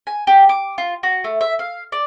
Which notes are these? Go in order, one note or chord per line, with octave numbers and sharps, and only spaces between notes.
G#5
G4
D6
F4
F#4
A3
E5
F5
D5